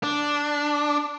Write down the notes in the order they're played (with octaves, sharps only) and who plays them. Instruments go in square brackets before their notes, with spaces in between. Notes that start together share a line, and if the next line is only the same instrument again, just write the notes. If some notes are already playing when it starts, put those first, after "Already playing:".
[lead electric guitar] D4